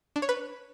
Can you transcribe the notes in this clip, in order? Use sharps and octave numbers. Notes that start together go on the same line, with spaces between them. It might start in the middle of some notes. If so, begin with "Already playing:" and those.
D4
C#5
B4